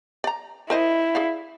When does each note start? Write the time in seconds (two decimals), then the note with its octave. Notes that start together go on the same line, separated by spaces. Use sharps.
0.24 D5 A#5
0.70 E4 A#4 C5 D#5
1.15 G#4 D5 F5